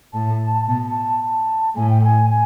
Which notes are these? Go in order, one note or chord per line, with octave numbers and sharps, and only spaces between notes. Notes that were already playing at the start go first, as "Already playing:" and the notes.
A2 A5
B2 A5
A5
A5
A2 G#5
G5
G#5
G#5